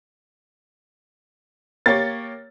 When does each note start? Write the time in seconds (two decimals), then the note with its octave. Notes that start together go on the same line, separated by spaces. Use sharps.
1.86 A#3 G4 C#5 A6